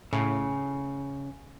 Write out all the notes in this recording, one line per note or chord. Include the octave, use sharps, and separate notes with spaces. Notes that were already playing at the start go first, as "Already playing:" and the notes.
A2 C#3